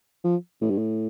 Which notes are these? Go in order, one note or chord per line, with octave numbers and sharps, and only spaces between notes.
F3
A2
G2
A2